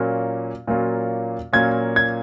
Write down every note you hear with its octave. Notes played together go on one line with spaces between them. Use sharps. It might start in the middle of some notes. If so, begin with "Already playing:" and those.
Already playing: A#2 F#3 A#3 C#4 F4
A#2 F#3 A#3 C#4 F4
A#2 F#3 A#3 C#4 F4 G#6
G#6